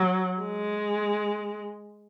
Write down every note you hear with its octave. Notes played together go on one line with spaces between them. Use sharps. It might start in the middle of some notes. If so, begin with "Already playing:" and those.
Already playing: F#3
G#3